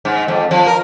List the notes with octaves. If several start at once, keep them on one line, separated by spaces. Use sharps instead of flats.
G#2
F2
F3
A#4